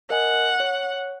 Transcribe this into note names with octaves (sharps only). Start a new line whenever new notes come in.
A#4 D#5 F#5 G#5
C#5